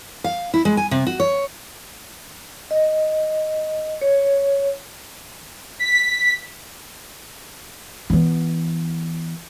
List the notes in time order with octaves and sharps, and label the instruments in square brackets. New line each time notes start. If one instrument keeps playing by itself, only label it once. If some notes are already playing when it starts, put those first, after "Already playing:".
[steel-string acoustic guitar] F5
E4
G#3
G#5
C3
F#4
C#5
[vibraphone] D#5
C#5
[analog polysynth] B6
[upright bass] E3 B3